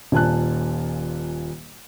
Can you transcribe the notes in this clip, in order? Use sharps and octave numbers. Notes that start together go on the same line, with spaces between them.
D#1 A#2 G#5 A5 F#6